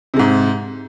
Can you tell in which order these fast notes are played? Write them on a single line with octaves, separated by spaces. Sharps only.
C3 G#3 G#2